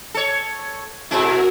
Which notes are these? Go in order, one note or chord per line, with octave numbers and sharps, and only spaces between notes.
A4 C#5
B2 G#3 E4 F#4 A#4